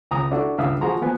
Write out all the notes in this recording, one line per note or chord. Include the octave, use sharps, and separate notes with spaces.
C#2 A#5 D#6
D4 E4 F#4 A4
C#2 G2 E5 F5 D#6 E6
F3 F#4 G#4 A#5 C6
F3 B3 G#5